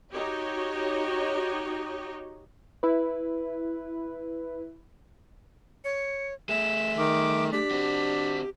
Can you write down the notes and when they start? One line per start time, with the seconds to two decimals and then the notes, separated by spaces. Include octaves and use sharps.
0.14 D#4 F#4 G4 C#5 D#5
2.83 E4 B4
5.85 C#5 C#7
6.49 A3 G#4 E5 E7
6.97 D#3 D6
7.53 D4 G4 B6
7.71 C4 F#4